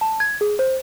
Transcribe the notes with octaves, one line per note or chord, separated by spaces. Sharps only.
A5
G#6
G#4
C5